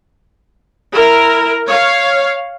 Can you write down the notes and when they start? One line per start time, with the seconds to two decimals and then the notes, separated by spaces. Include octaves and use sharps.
0.93 E4 A#4
1.66 C#5 F5